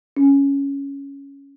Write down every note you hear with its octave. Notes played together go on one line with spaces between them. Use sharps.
C#4